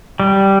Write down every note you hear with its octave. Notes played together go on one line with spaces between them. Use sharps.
G3